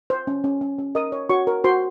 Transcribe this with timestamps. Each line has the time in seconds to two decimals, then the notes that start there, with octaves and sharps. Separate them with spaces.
0.10 C5
0.27 C#4
0.44 C#4
0.61 C#4
0.79 C#4
0.95 A#4 D#5 D#6
1.12 C#5
1.29 F#4 C#5 C#6
1.47 A#4
1.64 F#4 C5 C6